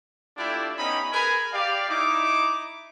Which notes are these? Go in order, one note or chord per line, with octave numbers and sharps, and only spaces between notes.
A3 D4 E4 F4 G4 D5
B3 C#4 D#4 G4 D#5 B5
G#4 A#4 B4 G#5 B5
G4 D5 F5
D#4 E4 D6